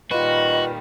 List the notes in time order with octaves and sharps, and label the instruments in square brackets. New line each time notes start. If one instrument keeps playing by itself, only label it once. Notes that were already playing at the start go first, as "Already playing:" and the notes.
[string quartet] A#2 D#3 G3 [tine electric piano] F4 B4 [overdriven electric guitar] F#4 [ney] D#5